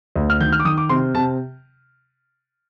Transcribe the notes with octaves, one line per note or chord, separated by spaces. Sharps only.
D2
F6
D#3 G6
F6
D6
D#3 D#6
D6
C3 C6
C3 A5